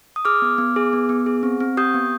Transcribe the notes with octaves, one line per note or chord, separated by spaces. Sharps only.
D#6
G#4 D6 F6
B3
B3
G#4
B3
B3
G#4
C4
C4
G4 D#6 G6
B3